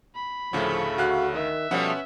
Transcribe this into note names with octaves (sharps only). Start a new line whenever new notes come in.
B5
D2 A2 C#3 F3 A3
D2 F#4 F5 F#6
D#3 E5
B2 F3 G3 A3 C#4 B4 F#5